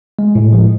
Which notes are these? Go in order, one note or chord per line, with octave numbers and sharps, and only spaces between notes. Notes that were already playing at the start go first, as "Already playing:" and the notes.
G#3
A2
F3